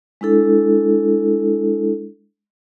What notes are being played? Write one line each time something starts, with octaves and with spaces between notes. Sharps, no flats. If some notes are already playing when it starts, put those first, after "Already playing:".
G#3 D4 E4 A4